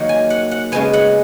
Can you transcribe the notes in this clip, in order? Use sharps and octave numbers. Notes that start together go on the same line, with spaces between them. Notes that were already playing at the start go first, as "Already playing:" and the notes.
Already playing: D#3 F#3 A#3 F#5
G#5
F#5
F#5
C#3 G#3 B3 G#5
F#5